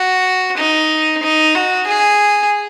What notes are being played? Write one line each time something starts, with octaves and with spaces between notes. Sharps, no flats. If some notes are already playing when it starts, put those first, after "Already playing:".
Already playing: F#4
D#4
D#4
F#4
G#4